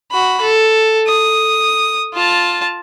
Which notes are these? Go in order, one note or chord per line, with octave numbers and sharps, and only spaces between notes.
F#4 B5
A4
D#6
F4 A5